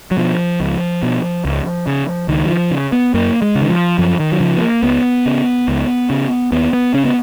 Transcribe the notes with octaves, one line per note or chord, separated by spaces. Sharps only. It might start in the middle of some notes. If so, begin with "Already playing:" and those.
F#3
B2 F3
C#2
B2
C#2
C#3
C#2 D#3
F#3
F3
C#3
B3
F#2 A#3
G#3
C#3
D#3
F3
F#2 F3
D#3
F#3
C#3 F3
B3
A#3
C#2 B3
C#3
C#2
C#3
D#2 B3
B3
C#3 C#4
B3